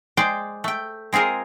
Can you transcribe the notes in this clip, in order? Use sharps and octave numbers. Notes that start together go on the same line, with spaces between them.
G#3 C5 D5 G5
A3 G5
G#3 C4 F4 G#4 A#4